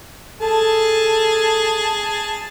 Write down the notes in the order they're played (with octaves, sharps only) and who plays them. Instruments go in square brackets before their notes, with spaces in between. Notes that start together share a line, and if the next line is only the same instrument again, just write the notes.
[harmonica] G#4 A5 [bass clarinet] A4